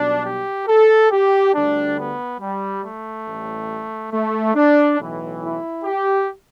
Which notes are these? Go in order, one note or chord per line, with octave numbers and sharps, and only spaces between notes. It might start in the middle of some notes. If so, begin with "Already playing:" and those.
Already playing: B1 B2 G3 D4
G4
A4
G4
D2 D3 G3 D4
B3
G3
A3
A1 A2 G3
A3
D4
B1 A2 E3
E4
G4